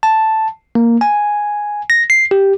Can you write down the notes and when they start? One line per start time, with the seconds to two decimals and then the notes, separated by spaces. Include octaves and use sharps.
0.03 A5
0.75 A#3
1.01 G#5
1.90 A#6
2.10 C7
2.31 G4